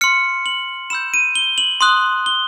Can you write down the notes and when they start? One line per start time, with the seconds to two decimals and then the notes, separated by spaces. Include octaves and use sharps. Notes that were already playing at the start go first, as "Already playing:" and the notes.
0.01 C6 F6 C#7
0.46 F#7
0.90 B5 E6 G6 E7
1.14 D#7
1.35 G7
1.58 F#7
1.81 C6 D#6 F#6
2.26 G7